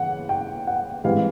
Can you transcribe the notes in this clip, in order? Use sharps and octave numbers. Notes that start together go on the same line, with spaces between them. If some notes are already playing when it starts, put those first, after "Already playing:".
Already playing: C#3 E3 F#5
G5
F#5
G#2 E3 G3 C4 F5